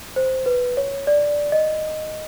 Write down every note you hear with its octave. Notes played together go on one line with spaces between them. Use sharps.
C5
B4
C#5
D5
D#5